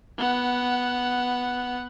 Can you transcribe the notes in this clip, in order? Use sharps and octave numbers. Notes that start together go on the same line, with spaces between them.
B3 F#5